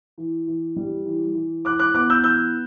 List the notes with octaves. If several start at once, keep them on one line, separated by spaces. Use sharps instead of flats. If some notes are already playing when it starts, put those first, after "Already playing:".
E3
E3
G3
E3
E3
E3 D6 F#6
D6 F#6
B3 D6 F#6
E6 G6
E3 E6 G6